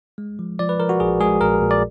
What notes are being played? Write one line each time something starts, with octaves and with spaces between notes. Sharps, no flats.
G#3
F3
F3 D5
B4
F3 A#4
F#4
A#1 G#4
G#3 G#4
A#1 A#4
A#2
D5